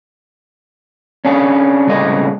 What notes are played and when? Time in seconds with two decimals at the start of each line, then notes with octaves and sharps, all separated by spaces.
1.25 C#4 D4 G#4
1.87 C2 A2 C#3 G#3 D#5